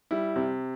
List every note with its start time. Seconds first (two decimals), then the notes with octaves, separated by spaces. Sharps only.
0.11 G3 E4
0.36 C3